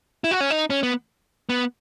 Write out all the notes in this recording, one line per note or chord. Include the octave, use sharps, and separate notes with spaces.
E4
F#4
C#4
D#4
C#4
B3
B3